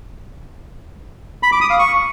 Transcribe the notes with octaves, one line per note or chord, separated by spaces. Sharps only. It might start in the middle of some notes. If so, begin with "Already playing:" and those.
B5
D6
D#6
F5
C#6